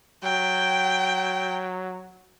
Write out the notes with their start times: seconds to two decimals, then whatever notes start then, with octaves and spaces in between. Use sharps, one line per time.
0.24 F#3 G5